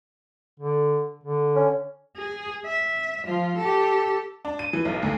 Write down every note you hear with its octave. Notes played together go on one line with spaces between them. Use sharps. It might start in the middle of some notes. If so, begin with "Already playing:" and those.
D3
D3
C#4
G#4
E5
F3 F4
G4 A4
D4
D#7
E3
B1
D2